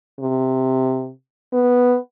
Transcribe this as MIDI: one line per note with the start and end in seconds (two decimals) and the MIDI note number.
0.20 1.10 48
1.53 1.97 59